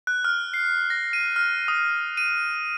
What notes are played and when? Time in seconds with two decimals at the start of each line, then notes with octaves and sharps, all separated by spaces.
0.07 F#6
0.25 F6
0.54 C7
0.90 A#6
1.13 D#7
1.36 F6
1.68 D#6
2.17 D#7